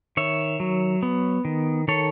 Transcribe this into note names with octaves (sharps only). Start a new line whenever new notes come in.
D#3 C#5 E5
F#3
B3
D#3
D#3 A4 C#5